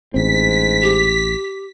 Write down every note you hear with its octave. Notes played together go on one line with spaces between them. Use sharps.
A1 G#2 C4 B6
G4